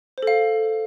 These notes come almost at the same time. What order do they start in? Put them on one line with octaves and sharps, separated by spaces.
C5 A4 F5